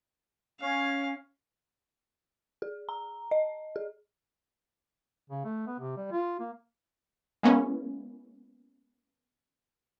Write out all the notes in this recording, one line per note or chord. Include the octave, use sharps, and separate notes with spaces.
C#4 F5
G#4
A#5
D#5
G#4
C#3
A3
B3
C3
G3
F4
A#3
G#3 A#3 B3 C#4 E4